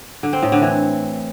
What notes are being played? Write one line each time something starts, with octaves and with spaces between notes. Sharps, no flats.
D3
C4
A2
D3
E3